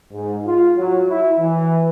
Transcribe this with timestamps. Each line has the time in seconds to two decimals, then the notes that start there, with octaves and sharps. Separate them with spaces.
0.13 G#2
0.46 F4
0.78 F#3
1.09 E4
1.39 E3